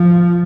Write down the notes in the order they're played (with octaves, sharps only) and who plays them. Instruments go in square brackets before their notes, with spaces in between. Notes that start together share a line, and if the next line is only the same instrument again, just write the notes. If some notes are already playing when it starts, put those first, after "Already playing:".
Already playing: [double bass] F3